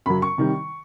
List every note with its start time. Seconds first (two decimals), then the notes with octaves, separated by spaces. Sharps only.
0.06 F#2 C#3 F#3 B5
0.22 C#6
0.38 C3 D#3 G3